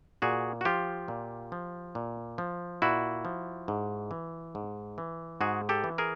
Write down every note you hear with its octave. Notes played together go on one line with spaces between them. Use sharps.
A#2 F#4 G#4
F#4
F3 F4 G4
A#2
F3
A#2
F3
A#2 E4 F#4
F3
G#2
E3
G#2
E3
G#2 F#4 G#4
G4 A4
E3
G#4 A#4